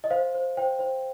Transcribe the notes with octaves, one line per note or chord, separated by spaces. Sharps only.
D#5
C5 F5
C5
C5 G5
C5